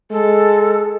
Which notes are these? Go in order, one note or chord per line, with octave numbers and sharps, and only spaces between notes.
G#3 A4